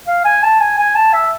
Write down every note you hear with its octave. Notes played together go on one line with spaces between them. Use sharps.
F5
G#5
A5
G#5
G#5
A5
E5